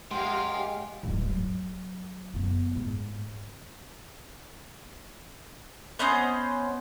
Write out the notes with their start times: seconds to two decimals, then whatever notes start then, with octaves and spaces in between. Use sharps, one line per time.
0.11 G#3 G4 F5 F#5 G#5 C6
1.03 D1 G2
1.30 F#3
2.34 F#1 B3
2.75 G#2
5.99 B3 C#4 C5 D#5